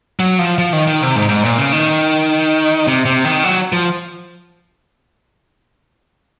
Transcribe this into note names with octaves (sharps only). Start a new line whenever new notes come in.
F#3
F3
F3
D#3
D#3
C3
G#2
G#2
A#2
C#3
D#3
C3
C3
D#3
F#3
F3